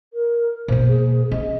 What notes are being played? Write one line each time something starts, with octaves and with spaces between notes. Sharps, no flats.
A#4
B2 A#3 C5
G#4
C#4 D#5